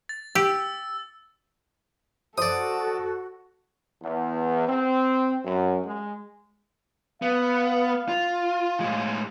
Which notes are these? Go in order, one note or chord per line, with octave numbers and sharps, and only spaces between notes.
A6
G4 E6
F#4 A4 C5 D5 D#6
E2
C4
F#2
G#3
B3 F5
F4
A2 G#3